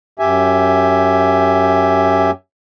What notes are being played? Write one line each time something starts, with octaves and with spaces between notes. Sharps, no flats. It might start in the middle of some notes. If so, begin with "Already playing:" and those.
F#2 G4 E5 G#5